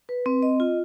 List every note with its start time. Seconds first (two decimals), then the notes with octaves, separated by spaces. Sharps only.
0.09 B4
0.26 C4
0.42 D#5
0.60 F4